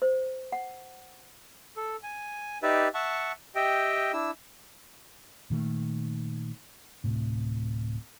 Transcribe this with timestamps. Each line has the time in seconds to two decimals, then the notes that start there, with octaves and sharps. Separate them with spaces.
0.02 C5
0.52 F#5
1.76 A4
2.03 G#5
2.63 D#4 G4 B4 D5 E5
2.94 E5 F#5 A5 C#6
3.55 G4 D#5 E5 G5
4.13 D4 E4 E6
5.50 A#2 D#3 A3
7.04 D1 A2 C3